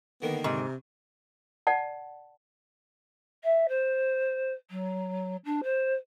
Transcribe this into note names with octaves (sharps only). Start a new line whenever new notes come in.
D3 D#3 A#3 B3
G#2 C3
D5 F#5 A5
E5
C5
F#3
D4
C5